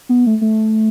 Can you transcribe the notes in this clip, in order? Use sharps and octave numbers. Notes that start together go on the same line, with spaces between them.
B3
A3
A3